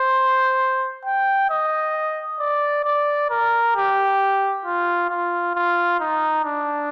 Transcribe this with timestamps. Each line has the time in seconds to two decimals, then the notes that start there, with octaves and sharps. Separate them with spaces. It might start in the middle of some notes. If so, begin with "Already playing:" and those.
Already playing: C5
1.05 G5
1.50 D#5
2.40 D5
2.85 D5
3.31 A#4
3.76 G4
4.65 F4
5.10 F4
5.55 F4
6.00 D#4
6.44 D4